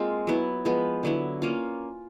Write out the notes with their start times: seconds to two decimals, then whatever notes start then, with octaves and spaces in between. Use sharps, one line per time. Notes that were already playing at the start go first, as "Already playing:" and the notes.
Already playing: G#3 A#3 C4 F4
0.27 F#3 B3 E4
0.65 F3 G#3 B3
1.03 D3 F#3 B3 E4
1.42 A#3 C#4 F4